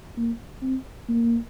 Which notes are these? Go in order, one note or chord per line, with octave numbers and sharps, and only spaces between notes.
A#3
C4
A#3